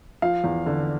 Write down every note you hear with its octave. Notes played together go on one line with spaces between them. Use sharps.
F3 F5
E2
D3